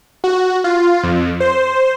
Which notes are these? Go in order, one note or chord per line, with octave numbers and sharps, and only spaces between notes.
F#4
F4
F2
C5